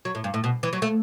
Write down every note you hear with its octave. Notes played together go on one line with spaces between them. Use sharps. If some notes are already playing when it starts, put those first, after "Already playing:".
F#3
A2
G2
A2
B2
E3
F#3
A3